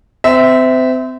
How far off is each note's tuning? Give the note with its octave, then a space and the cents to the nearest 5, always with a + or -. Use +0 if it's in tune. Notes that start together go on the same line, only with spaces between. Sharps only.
C4 -30 E5 -10